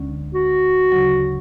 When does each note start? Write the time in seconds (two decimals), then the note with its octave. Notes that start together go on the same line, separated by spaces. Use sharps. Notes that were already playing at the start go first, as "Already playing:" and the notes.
Already playing: D2 D3 G#3 C#4
0.34 F#4
0.92 D2 C#3 F#3